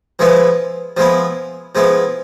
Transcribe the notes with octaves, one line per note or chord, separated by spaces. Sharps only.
F3 G#3 B3 E4
F3 G#3 B3 E4
F3 G#3 B3 E4